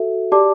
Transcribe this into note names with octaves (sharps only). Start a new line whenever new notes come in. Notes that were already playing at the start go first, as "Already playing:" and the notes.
Already playing: F#4 A4 E5
G4 D5 A5 D6